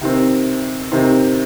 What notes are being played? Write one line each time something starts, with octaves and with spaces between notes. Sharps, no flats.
C3 D#3 C4
C3 D#3 C4